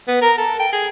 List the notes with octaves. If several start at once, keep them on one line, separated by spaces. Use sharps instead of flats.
B3
A#4
A4
G5
G#4